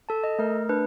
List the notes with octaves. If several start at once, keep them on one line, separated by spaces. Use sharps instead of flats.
A4 A5
D#5
A3 A#4
D4 B4